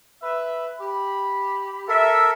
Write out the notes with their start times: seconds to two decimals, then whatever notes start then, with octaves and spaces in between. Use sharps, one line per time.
0.23 B4 E5
0.80 G4 B5
1.88 A4 A#4 E5